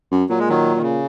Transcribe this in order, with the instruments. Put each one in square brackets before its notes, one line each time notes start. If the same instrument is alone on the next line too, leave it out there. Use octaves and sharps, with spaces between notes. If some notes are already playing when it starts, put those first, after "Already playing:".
[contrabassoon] F#2
[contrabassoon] A#2 [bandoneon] F#3
[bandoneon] G#3
D#3 F#3
D#3
C#3